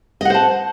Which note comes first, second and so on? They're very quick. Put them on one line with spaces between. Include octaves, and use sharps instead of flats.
D#5 F#5 C5 A5